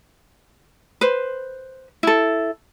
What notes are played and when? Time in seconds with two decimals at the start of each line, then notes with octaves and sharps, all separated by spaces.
1.01 B4 C5
2.03 E4 A4